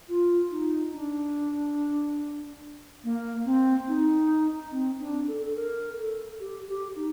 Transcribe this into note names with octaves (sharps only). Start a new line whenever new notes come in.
F4
D#4
D4
A#3
C4
D#4
C4
D4
A4
A4
A#4
A4
G4
G4
D#4